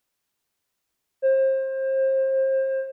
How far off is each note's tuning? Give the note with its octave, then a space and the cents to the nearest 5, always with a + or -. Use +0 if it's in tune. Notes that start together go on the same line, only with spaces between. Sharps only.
C5 +30